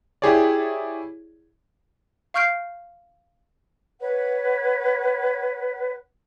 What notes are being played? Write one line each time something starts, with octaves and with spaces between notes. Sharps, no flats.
E4 G4 G#4 C#5 D5
F5 C#6 F6 G6 C7 D7
B4 C#5 F#5